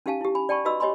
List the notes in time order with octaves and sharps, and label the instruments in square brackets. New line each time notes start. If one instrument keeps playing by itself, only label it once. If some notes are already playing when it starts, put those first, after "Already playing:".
[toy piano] C#4 D#4 G4 F5 G#5 A5
E4 G4
G#5 B5
D5 G5 A5 B5 C#6
D#4 F#4 B4 D#5 B5 E6
G4 C#5 D#5 G#5 B5 C6